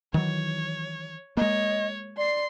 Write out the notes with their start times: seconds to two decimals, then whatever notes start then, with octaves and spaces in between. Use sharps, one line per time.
0.14 D#3 E3 F#3 C#5
1.37 G#3 A#3 C#5 D#5
2.17 D5 C6 C7